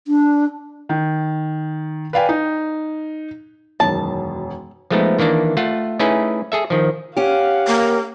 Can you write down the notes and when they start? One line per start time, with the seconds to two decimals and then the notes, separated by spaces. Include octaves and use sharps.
0.08 D4
0.89 D#3
2.13 B4 D5 F5 G5 G#5
2.29 D#4
3.80 E1 F#2 D#3 A5
4.90 F3 G#3 A3 B3 D#4
5.19 D#3 E3 A#3 D4
5.57 A3 F4 F#5
5.99 A3 C#4 D#4 E4 G#4 B4
6.52 G#4 A4 E5
6.70 D#3 F3
7.17 C#4 G4 F5 F#5
7.67 A#3